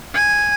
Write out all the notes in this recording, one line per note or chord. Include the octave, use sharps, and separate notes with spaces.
G#5